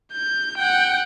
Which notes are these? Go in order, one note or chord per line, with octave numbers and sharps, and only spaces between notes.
G6
F#5 G5